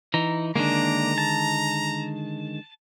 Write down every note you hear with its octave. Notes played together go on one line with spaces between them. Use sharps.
E3 D#4 A#5
D3 D#3 G#3 A#3 D4 A#5
A5